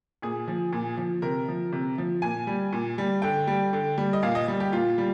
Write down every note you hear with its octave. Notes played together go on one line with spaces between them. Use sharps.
A#2 G#4
F3
A#2
F3
C3 A#4
F3
C3
F3
A#2 G#5
G3
A#2
G3
D3 G5
G3
D3
G3
D#5
A#2 F5
D#5
G3
G4
A#2 F4
G3